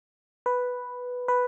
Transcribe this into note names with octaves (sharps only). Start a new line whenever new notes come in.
B4
B4